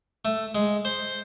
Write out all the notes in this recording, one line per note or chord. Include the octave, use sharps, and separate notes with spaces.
A3
G#3
C5